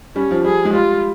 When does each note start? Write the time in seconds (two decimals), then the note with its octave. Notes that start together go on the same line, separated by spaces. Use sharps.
0.16 G3 C#4
0.31 F3
0.45 G3 G#4
0.65 G#3
0.73 G3 F4